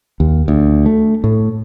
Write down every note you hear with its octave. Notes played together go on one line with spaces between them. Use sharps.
D#2
D2
A3
A2